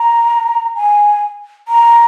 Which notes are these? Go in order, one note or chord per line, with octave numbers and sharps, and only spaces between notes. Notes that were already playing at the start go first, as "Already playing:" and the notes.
Already playing: A#5
G#5
A#5